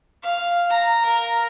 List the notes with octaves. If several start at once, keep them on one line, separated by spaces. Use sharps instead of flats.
F5
A#5
A#4